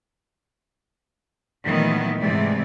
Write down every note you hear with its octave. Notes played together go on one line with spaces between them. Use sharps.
A#2 D#3 E3 F#3 A3 B3
G#2 C3 E3 G#3 A3 D5